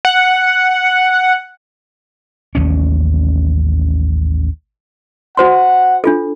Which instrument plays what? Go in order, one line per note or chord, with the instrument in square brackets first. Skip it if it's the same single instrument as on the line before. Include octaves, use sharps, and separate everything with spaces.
[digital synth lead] F#5
[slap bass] A1 D#2 G#2 C#4
[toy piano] F#4 C5 C6 [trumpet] F#5
[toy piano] D4 F4 A4